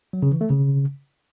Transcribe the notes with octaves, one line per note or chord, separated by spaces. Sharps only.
F#3
C#3
E3
A3
C#3